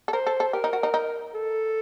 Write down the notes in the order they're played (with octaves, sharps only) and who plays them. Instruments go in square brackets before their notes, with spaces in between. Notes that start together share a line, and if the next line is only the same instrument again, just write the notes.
[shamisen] A4
[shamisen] A#4 [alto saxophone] C5
[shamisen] A4
A4
[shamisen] G4 [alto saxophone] A#4
[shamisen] D#4
F#4
D#4
D#4
[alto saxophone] A4